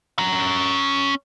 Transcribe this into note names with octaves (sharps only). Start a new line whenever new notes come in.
C#4 A#5